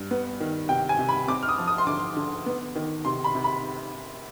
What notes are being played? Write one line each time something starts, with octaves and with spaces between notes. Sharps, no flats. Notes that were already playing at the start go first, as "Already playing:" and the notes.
Already playing: G2
B3
D#3
C3 G5
G#5
C3
B5
C4 D6
F6
D#6
F3
D#6
C6
D3 D6
D3
B3
D#3
C3 C6
B5
C3
B5